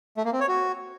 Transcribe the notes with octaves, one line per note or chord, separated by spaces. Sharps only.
A3
A#3
C4
C#5
F#4